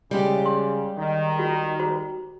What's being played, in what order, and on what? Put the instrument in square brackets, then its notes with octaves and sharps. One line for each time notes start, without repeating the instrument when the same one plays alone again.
[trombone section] C#3 [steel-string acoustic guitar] G3 G#3 G4
[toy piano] C6
[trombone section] D#3
[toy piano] F4 F#4
F#4 C5 A#5